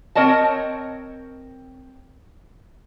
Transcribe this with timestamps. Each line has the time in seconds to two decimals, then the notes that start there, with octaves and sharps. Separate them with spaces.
0.15 C4 A#4 C#5 D#5 A5